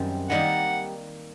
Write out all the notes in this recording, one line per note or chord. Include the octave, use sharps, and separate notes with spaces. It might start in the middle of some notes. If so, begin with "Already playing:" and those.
Already playing: F#2 D#3 G3 C4
D#3 G3 A#3 D#4 F#5